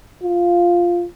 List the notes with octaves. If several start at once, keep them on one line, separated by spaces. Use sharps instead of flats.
F4